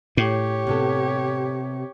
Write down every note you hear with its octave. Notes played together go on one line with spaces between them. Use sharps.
A2 G4 C#5
C3 B3 A4